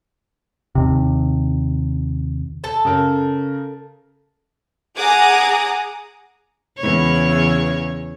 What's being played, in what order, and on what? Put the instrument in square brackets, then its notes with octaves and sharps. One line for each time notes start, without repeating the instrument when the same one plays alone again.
[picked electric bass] D#2 C3
[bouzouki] A4 A5
[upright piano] C#3 A#4
[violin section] G#4 F#5 G#5 A#5 D6 D#6
[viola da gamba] E2 C#3 C#5